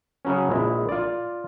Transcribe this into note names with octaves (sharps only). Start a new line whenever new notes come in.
C#3 F#3 C#4
A#1 G#3 E4
F4 D5